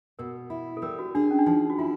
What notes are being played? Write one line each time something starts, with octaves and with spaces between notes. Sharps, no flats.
B2 A#4
E4
A4
G3 A#4
F#4
D4 G#4
C#4
D4
F3 D#4
F#4
E4 F4